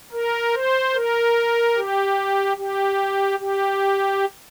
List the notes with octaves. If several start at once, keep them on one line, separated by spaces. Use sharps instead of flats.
A#4
C5
A#4
G4
G4
G4